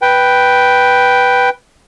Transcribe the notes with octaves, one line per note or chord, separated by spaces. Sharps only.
B4 G5